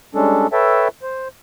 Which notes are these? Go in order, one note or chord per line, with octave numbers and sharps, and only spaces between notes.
G3 G#3 C#4 D4 A4
A4 B4 C#5 E5 G5 A5
C5